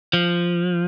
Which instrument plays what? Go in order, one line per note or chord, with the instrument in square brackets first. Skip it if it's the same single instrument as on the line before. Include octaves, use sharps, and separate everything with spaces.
[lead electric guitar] F3